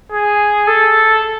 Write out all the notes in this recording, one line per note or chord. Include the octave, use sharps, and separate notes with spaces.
G#4
A4